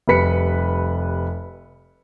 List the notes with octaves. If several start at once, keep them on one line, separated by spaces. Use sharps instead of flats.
F1 G3 B4 B6 C#7